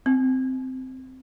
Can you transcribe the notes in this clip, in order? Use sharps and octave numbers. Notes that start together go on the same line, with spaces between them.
C4